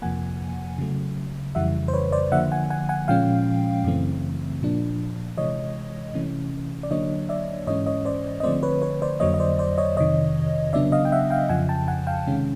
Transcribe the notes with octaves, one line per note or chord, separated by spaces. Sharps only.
F2 C3 F3 A#3 F#5 G#5
C#3 F#3 A3
F2 C#3 E3 G3 E5 F#5
C5
B4 C#5
C5 D5
D3 F3 A#3 E5 F#5
F#5 G#5
F#5 G#5
F#5 G#5
A#2 F3 G#3 C#4 F5 G5
F#2 C#3 E3 A3 C4
A#2 F3 A#3 D4
C3 E3 G#3 C#5 D#5
C3 E3 A3 C#4
D5
D3 F#3 A#3 D4 C#5 D#5
D5 E5
G#2 E3 G#3 C#4 C#5 D#5
C#5 D#5
C5 D5
D#5
D3 F3 A3 C4 C5 D5
B4 C#5
B4 C#5
C5 D5
F2 D3 F#3 A#3 C#5 D#5
D#5
C5 D5
C5 D5
C#5 D#5
F2 C3 D#3 C#5 D#5
C#3 F#3 B3 D4 D5 E5
D#5 F5
G5
E5 F#5
F5 G5
F2 C#3 F3 F#5 G#5
G5 A5
F#5 G#5
F5 G5
C3 D#3 G#3 C#4